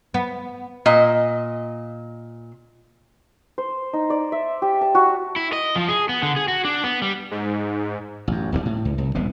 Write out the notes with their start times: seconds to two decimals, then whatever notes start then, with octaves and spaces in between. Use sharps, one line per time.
0.14 B3
0.86 A#2 D#5
3.58 C5
3.93 D#4
4.10 D5
4.32 E5
4.62 G4
4.81 A5
4.95 F#4
5.36 E4
5.53 D#5
5.76 F3
5.89 G#4
6.09 B3
6.23 D3
6.36 G#4
6.48 F#4
6.65 D4
6.84 B3
7.02 G3
7.31 G#2
8.28 A1 F#2
8.52 D#1 B1 G2 G3
8.66 A2
8.85 C#2
8.98 C2
9.15 D#1 C2 C3 B3